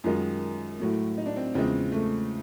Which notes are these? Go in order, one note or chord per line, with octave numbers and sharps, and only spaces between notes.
F#2 D#3 G#3 F4
A2 F#3 A3
D#4
D4
C4
E2 C#3 F3 G#3 C4
A3